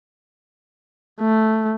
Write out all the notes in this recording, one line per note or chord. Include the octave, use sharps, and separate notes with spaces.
A3